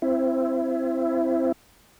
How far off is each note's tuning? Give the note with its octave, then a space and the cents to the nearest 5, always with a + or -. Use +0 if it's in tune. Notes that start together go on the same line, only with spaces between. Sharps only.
C4 +0 E4 +20